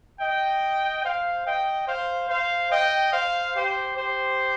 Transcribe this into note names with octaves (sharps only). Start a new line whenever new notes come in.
D#5 G5
C5 F5
D#5 G5
C5 F5
C5 F5
D#5 G5
C5 F5
G4 C5
G4 C5